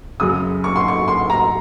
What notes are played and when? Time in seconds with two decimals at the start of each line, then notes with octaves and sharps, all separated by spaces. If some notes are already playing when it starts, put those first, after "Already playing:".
0.20 F#2 C#3 D#6
0.64 C#6
0.76 C6
0.88 C#6
1.08 C6
1.30 A#5